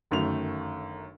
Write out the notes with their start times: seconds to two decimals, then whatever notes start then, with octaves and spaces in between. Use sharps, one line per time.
0.11 G1 F#2 D#3 A3 F7